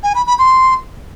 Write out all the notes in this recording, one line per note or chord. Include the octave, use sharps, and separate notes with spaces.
G#5
B5
B5
C6